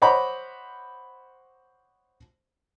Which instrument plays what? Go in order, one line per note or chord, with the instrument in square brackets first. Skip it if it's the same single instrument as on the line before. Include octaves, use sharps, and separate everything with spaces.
[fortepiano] C5 C#5 D#5 F#5 B5 D6